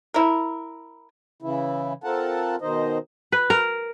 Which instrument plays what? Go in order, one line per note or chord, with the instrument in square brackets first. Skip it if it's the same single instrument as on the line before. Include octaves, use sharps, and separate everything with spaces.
[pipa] E4 A#4
[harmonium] C#3 E3 E4
C4 F4 A4 A#4 F#5 A5
B2 D#3 D#4 C5 D#5
[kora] B4
A#4